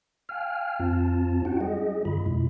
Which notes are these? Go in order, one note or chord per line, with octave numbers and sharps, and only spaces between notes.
F5 G5 G#5 F6
F2 C4 F4 A5
C#4 E4 F#4 F#5 G5
G3 G#4 D#5
G2 D3 F4 B5
F2 B2 G#3 E4